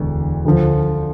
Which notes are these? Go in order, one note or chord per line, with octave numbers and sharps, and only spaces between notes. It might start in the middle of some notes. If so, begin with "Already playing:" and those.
Already playing: E1 D2 D3
D2 D3 F3